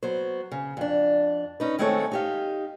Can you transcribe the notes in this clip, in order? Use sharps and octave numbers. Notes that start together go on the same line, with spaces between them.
F#3 B3 C5
C#3
F2 D4
C#4 D#4 B4
D#3 G#3 A3 C4 A4 C#5
D#4 G4 F5